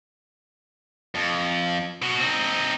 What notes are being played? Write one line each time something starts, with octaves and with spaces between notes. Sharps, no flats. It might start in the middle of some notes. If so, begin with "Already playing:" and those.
F2
B2 F#4
C4 D#4